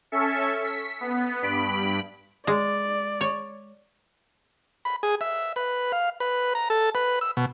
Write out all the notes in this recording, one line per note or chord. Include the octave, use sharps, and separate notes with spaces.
C#4 A4 E5 C#7
B6
B3
G2 B5 D7
G#3 D5
C#5
B5
G#4
E5
B4
F5
B4
A#5
A4
B4
E6
B2